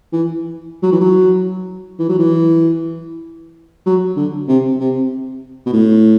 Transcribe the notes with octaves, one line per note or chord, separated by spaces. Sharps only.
E3
F#3
E3
F#3
E3
F#3
E3
F#3
D3
C3
C3
B2
A2